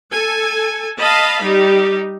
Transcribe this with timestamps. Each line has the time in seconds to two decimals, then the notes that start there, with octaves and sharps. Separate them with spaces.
0.13 A4 G#5
1.00 D#5 F5 A5 B5
1.43 G3 D#4 G4